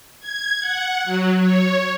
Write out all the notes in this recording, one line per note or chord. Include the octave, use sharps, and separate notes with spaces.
G#6
F#5
F#3
C#5